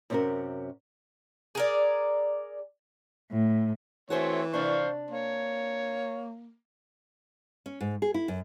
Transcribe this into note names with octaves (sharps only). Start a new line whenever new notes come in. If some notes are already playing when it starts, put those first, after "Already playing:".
F#2 C3 B3 C#4 F#4 A#4
G#4 A#4 D5
A2
E3 A3 C4 F#4 G#4 C5 C#5
C3 D4 C5 F5 C#6
A#3 C#5
C#4
G#2
G#4
E4
F#2